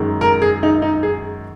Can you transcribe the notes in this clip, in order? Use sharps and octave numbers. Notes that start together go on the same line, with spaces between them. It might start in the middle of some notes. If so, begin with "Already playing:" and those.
Already playing: F#2 D#3 G#3
A#4
G#4
D#4
D#4
G#4